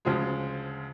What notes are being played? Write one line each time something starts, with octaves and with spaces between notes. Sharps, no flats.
D2 C#3 F3 G#3